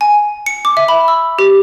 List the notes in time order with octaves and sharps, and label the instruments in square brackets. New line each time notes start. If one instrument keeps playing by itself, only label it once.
[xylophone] G#5
C#7
D6
E5
B5
E6
G4